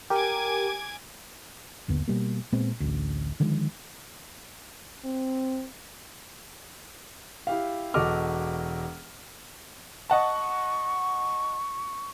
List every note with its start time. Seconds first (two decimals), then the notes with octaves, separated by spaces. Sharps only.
0.10 G4 A#4 G#5 D6 G#6
1.88 G1 D#2 D3 B3
2.08 B2 G3 A#3
2.52 A#2 G#3 B3 C4
2.80 A1 D2
3.40 D3 D#3 F3 G#3
5.05 C4
7.47 E4 G4 F5
7.94 E1 F#4 A4 D#5 D6 F6
10.10 D#5 F#5 A5 C#6